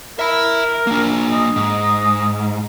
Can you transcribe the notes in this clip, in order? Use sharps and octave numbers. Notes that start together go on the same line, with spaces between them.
A#4 E5 B5
A#3 D4
D#5
G#2